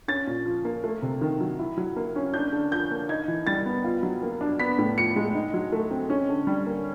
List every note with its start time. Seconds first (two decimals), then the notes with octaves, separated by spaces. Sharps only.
0.08 C#4 A6
0.27 A#2
0.46 F3
0.65 A#3
0.84 A3
1.02 C3
1.21 D#3
1.40 F#3
1.59 E4
1.78 F#3
1.96 A#3
2.16 C#4
2.34 D4 G6
2.53 D3
2.71 F3 G6
2.91 A#3
3.09 D#4 G#6
3.28 E3
3.47 G3 A6
3.66 B3
3.84 F4
4.03 F#3
4.23 A#3
4.41 D4
4.59 B3 B6
4.78 A2
4.97 F3 C#7
5.16 G#3
5.35 D#4
5.54 F#3
5.72 A3
5.91 C4
6.10 C#4
6.29 D3
6.47 G3
6.66 A#3